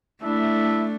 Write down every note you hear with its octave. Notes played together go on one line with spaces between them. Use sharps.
A3 D4 E4 E5